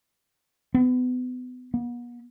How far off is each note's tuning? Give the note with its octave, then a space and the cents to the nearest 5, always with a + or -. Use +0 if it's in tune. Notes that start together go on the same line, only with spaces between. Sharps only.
B3 +30
B3 -40